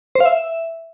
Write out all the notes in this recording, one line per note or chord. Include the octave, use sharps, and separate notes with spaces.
C5
F5
E5